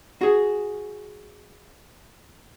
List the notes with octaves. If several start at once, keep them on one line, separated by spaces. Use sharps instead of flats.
F#4 G#4